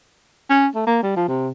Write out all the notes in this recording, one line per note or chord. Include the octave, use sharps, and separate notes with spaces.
C#4
A3
A#3
G3
F3
C3